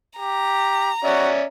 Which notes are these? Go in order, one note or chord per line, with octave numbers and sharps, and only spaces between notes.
G4 A#5
C#4 F#4 D5 E5